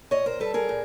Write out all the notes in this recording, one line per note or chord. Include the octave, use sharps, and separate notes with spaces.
A#2 C#5 D#5
A#4 C5
G3 A4 B4
G#4 A#4
A#2